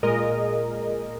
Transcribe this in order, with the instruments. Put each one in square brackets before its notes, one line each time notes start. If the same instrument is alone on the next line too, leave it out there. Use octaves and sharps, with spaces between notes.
[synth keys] A#2 G#3 A#4 D#5